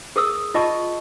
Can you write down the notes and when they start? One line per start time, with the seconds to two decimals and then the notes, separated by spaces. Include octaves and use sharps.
0.16 G#4 A#4 D#6 E6
0.54 F4 D#5 A5 C#6